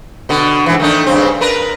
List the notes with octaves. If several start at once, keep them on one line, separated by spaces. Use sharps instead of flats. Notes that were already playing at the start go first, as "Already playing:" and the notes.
B2 D3
G#2 E3
D#3 A3 D4
G2 C#3 C4
D4 A#4 B4